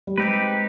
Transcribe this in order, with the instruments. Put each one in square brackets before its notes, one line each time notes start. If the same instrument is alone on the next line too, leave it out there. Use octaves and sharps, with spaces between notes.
[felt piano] G3
[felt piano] G#3 [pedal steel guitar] C4 D#4 G4 B4